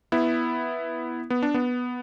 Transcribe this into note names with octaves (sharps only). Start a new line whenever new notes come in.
B3 E4
B3
D4
B3